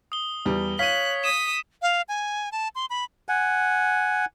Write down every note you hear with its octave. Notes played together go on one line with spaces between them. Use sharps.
D#6 G7
E2 G3
C#5 F5 F#6 B6 D#7
D#6 B6 E7
F5
G#5
A5
C6
B5
F#5 G#5